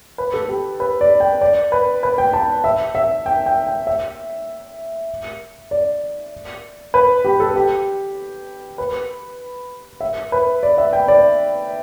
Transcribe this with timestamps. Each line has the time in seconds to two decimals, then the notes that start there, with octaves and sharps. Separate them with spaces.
0.18 B4
0.34 A4
0.49 G4
0.80 B4
1.01 D5
1.20 G5
1.41 D5
1.72 B4
2.03 B4
2.18 G5
2.33 A5
2.64 E5
2.95 E5
3.26 G5
3.46 G5
3.67 G5
3.87 E5
5.71 D5
6.94 B4
7.25 G4
7.40 A4
7.56 G4
8.78 B4
10.01 E5
10.32 B4
10.63 D5
10.78 E5
10.93 G5
11.08 D5